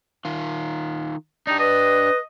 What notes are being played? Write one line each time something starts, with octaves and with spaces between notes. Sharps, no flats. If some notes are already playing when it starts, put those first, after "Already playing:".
D#3 F4
D4 D#4 G4
B4 D#5